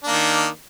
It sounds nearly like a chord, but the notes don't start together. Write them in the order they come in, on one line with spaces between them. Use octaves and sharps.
D4 A#3 D#3